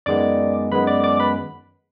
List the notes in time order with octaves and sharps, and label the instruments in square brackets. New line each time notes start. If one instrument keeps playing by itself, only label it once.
[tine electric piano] F#2 D#3 G#3 B3 D5 D6
F#2 D#3 G#3 B3 B4 B5
D5 D6
D5 D6
B4 B5